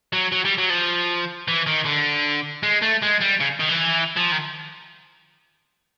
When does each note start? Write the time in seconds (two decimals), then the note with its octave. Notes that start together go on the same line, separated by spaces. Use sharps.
0.13 F#3
0.32 F#3
0.45 G3
0.58 F#3
0.70 F3
1.48 E3
1.67 D#3
1.85 D3
2.63 G#3
2.82 A3
3.02 G#3
3.21 G3
3.40 C#3
3.60 D#3
3.69 E3
4.16 F3
4.32 D#3